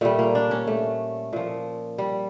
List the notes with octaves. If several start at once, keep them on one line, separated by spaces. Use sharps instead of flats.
A#2 G3 A3
A#3
D4
C#4
A3
A#2 F3
G3